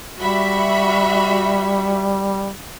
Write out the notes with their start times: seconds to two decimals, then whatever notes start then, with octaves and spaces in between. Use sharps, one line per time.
0.19 G3 F#4 E5 B5